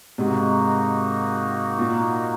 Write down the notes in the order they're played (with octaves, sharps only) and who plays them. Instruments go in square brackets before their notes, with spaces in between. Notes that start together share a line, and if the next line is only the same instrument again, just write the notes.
[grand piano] G#2 C3 [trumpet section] A#3 D#4 F#4
[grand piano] A#2